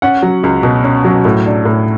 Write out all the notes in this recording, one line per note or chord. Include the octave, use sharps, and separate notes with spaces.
C#4 F#5
F#3
C#2
B2
C#4
F#3
A2
D4
A2